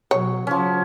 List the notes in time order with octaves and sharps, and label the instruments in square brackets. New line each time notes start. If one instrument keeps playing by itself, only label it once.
[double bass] B2 F#3 [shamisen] C#5
[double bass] C#3 F#3 [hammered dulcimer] F3 C#4